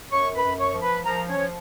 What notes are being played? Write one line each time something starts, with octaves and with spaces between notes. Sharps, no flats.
F#2 C#5 C#6
B4 B5
F#2
C#5 C#6
F3
B4 B5
F3 A#4 A#5
C#4 C#5
F3